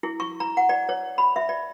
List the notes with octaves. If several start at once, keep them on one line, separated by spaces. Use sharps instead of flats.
E4
C#6
A#5
F#5
D5
C#5
B5
E5
D5